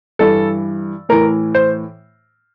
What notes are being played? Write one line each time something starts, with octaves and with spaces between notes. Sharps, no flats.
G2 E3 A4
A2 E3 A#4
C5